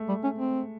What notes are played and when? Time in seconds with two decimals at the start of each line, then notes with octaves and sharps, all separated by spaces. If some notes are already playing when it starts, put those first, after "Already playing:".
Already playing: G#3 A3
0.09 G3
0.24 C#4
0.38 C4